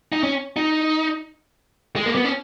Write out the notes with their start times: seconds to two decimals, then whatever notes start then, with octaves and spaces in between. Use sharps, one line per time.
0.12 D#4
0.23 C#4
0.56 D#4
1.96 G#3
2.06 A#3
2.15 B3
2.25 C#4